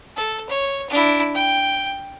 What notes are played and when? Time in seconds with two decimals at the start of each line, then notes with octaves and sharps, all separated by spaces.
0.16 A4
0.49 C#5
0.90 D4 E4
1.34 G5